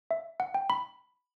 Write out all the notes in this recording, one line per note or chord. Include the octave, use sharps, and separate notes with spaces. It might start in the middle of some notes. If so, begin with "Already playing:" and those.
E5
F#5
G5
B5